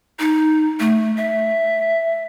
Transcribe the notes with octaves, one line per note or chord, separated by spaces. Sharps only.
D#4
A3
E5